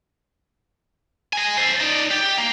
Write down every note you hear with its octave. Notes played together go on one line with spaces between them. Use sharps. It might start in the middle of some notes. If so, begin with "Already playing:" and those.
D#5 G#5
A4 C5
D#4 D5
G4
A#3